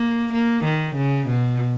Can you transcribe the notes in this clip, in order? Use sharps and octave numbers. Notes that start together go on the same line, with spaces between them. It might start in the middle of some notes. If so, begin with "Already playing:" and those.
Already playing: A#3
A#3
D#3
C#3
B2